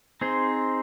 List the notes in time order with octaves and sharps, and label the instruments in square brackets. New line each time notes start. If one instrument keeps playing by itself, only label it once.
[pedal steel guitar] C4 D#4 G#4 C5